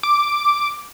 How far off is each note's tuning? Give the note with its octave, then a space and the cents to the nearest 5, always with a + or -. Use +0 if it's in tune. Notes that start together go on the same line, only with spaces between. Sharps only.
D6 +0